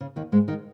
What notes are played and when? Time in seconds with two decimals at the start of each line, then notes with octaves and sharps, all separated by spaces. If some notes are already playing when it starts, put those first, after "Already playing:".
0.01 C#3
0.16 D#2 D#3
0.32 G#2 G#3
0.48 D#3 D#4